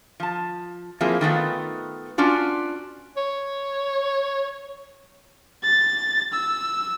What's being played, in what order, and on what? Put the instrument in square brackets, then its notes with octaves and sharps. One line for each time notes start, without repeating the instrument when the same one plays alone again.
[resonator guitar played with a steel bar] F3 A5
F3 A#3 C4 E4 G#4
D#3 A3 B3 F4
C#4 D4 F4 F#4
[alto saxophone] C#5
[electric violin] A6
E6